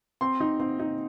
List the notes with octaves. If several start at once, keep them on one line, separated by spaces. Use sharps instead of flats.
C4 C6
D#4
C4 C6
D#4